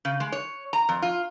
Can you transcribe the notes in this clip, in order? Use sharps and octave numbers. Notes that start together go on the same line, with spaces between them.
C#3
G#3
C#5
A#5
F2
F4